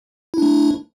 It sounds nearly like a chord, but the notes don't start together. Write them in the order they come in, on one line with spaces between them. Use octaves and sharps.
E4 D4 A3